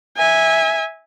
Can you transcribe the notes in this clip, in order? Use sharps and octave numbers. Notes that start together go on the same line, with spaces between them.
E5 G#5